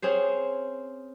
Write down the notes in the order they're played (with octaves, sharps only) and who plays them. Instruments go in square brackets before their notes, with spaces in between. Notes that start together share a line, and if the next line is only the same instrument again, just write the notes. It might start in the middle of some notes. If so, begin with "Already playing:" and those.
[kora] C4 C#4 G#4 C5